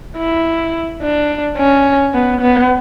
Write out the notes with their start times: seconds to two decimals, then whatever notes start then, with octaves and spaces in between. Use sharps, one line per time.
0.17 E4
1.02 D4
1.57 C#4
2.14 B3
2.41 B3